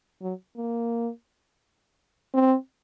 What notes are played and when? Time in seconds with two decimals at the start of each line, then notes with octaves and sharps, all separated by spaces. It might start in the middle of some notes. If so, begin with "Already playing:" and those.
0.22 F#3
0.57 A#3
2.34 C4